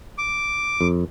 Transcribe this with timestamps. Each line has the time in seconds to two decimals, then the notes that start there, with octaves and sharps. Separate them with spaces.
0.18 D6
0.81 F2